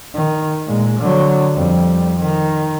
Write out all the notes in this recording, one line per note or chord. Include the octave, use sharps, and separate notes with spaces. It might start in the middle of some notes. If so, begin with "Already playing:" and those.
D#3
A#2 G#3
D3 F#3
F2 G3
D#3